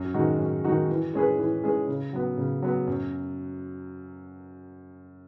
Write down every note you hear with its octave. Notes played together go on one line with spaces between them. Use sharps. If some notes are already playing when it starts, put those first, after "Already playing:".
Already playing: F#2
D#3 G#3 D#4 F#4
F#2
D#3 G#3 D#4 F#4
E3
G#3 C#4 G#4 B4
E3
G#3 C#4 G#4 B4
C#3
F#3 B3
C#3
F#3 B3
F#2